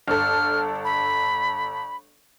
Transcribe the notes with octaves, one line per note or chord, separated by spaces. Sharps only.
G1 A4 F6
B5